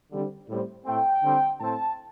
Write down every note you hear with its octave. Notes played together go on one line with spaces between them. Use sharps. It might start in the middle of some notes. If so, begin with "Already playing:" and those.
D3 G3 C4
A2 G3 C4
A2 A3 C4 G5
D3 G3 C4
A2 A3 C4 A5